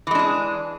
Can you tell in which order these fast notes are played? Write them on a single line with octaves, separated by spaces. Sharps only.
E3 G#3 D4 G#4